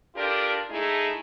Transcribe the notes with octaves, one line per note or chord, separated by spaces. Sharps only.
D4 F4 G4 A4 A#4 D5
A3 D#4 E4 G#4